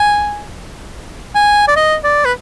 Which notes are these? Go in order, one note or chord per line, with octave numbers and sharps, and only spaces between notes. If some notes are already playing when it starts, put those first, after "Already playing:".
Already playing: G#5
G#5
D5
D#5
D5
B4